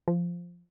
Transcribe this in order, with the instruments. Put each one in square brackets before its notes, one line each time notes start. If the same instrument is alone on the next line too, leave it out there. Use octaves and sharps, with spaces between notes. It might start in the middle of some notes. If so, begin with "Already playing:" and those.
[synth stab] F3